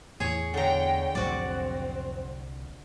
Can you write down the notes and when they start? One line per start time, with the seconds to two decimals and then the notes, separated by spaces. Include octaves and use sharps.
0.20 E2 A2 G#4 C#5
0.54 D3 C#5 G5 A#5
1.15 C2 F2 A2 F#3 C4 F#4 D5